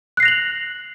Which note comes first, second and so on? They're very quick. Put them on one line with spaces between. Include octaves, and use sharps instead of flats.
F#6 C7 A#6 F7 F#7